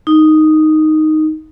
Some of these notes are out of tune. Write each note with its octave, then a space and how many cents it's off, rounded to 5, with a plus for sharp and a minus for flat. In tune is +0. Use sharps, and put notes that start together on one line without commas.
D#4 +0